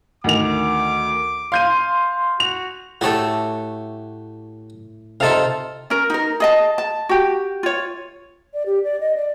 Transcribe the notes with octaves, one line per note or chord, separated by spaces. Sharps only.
D2 D#3 D6 F7
F5 C6 G6 D#7
F#4 F7
A2 A3 F#4 G4 A4 C#5
C3 D#4 F4 A4 F5
C#4 A#4
D#4 A#4
G#4 D#5 A5
A5
F#4 G4
F4 C#5
D5
G4
D5
D#5
D5